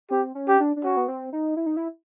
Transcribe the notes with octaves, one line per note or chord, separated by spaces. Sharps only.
C4 G4
C#4
G4
D4
D4
C#4 F#4
B3
C4
D#4
E4
D#4
E4